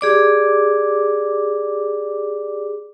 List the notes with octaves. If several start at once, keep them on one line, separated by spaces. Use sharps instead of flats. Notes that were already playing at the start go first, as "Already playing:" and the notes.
G4 G#4 D5 D6